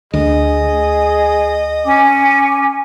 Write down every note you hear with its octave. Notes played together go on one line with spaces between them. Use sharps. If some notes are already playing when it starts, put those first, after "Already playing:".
D2 G#4 D#5
C#4 G#5 D6